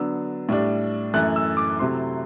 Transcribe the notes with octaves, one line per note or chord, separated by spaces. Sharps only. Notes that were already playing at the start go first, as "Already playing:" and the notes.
Already playing: D3 F#3 B3 D4 E6
A2 G3 D4
F#2 E3 A3 F#6
E6
D6
C3 F#3 A3 C4 E4 C6